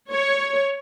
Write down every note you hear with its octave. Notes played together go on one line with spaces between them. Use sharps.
C#5